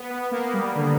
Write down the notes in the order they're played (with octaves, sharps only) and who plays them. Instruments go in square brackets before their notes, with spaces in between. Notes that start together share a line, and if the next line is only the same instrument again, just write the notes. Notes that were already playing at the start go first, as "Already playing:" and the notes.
Already playing: [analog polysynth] B3
B3
A#3
G3
D3